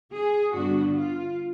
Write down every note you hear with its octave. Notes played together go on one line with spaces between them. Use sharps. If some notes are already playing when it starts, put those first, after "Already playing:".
G#4
G2 D3 G3 B3 D4 F#4
F4